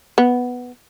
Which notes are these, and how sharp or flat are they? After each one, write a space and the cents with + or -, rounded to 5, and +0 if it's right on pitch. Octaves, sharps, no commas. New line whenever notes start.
B3 +0